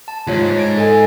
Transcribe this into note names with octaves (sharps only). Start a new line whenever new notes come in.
A5
D#2 G#2 F4 C#5
G#6 D7
A4 D#5 G#5